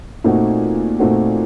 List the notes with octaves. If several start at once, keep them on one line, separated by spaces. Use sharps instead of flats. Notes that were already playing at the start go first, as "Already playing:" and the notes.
A#2 A3 C4 D#4 F#4
A#2 A3 C4 D#4 F#4